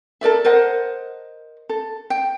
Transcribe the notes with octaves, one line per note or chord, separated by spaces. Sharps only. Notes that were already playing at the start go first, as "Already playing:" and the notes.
A4 A#4 D5 E5
A#4 C5 D#5 F#5
A4
G5